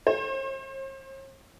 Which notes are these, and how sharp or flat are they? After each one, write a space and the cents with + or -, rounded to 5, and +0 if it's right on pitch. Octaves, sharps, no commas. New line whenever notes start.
C5 +45